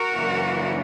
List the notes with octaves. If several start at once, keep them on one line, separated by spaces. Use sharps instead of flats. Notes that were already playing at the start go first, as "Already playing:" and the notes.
Already playing: F#4 A#4
F#2 C#3 E3 A#3 D4